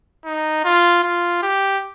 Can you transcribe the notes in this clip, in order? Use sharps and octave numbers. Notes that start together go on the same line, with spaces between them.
D#4
F4
F4
G4